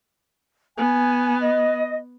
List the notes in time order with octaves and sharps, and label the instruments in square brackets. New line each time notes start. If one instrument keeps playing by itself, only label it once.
[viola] B3 [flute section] G#5
[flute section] D#5